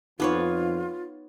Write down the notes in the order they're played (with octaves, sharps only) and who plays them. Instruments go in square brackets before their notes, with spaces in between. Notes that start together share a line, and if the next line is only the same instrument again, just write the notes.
[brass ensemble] F2 [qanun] B3 B4 C#5 [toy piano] D#4 D6 [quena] F4